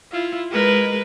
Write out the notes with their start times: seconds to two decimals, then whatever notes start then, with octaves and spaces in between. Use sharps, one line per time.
0.12 E4 F4
0.51 G#3 A#4 B4